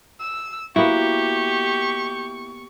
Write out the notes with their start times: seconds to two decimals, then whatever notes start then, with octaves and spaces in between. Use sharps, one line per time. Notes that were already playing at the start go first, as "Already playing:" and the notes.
0.20 E6
0.76 A#3 B3 E4 F#4 G4 C#6